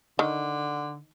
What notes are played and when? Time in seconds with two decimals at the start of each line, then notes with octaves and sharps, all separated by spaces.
0.19 D3 D#3